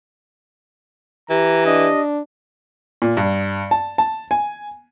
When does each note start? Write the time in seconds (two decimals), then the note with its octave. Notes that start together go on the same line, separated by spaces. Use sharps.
1.30 E3 G4 A#5
1.66 D4 D#5
3.02 A#2
3.17 G2
3.71 A5
3.98 A5
4.31 G#5